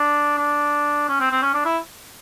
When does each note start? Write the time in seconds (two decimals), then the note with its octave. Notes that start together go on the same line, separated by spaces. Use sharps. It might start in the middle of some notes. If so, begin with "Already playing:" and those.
Already playing: D4
0.38 D4
1.09 C#4
1.20 C4
1.31 C4
1.42 C#4
1.54 D4
1.65 E4